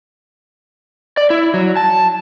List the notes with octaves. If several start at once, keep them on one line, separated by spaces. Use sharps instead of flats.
D5
E4
F#3
A5